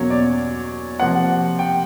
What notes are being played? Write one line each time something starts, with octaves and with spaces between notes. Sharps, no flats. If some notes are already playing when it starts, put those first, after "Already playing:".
Already playing: E2 B2 F#3 A#3 C#4 C#5
D5
C3 F3 A#3 F#5
G5